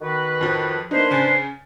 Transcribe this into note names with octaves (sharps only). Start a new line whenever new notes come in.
D#3 F#4 B4
F2 F3
A#3 D4 D#4 B4 C5
C#3 G#5 A6